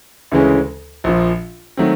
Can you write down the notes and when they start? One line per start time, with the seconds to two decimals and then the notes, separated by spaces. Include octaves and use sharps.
0.32 D2 C#3 E3 G#3 C#4
1.04 A#1 A#2 F3
1.77 D#3 F#3 A3 C4